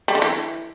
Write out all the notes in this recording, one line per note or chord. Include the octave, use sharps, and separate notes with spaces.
G3
D3
E3